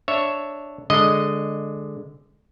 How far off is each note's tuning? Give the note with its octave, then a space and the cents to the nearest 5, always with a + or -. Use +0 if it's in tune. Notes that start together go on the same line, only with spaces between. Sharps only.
D4 +0 C#5 +0 E5 +0
D3 +5 G#3 +0 D#5 +0